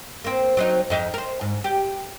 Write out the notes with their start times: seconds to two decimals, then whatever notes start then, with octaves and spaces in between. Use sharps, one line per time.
0.24 A#3 C4
0.57 F#3 C4 D#4
0.90 F2 D#4
1.14 A#4 C5
1.41 G#2
1.64 G4